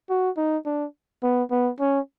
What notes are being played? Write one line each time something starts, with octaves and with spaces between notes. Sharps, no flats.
F#4
D#4
D4
B3
B3
C#4